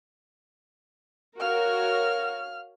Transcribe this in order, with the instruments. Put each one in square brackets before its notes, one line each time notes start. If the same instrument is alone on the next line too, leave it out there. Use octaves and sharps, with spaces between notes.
[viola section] F#4 A#4 C#5 [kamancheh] F5 F6